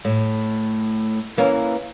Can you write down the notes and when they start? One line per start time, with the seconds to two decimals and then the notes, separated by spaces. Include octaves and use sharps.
0.05 A2
1.37 E3 A#3 C#4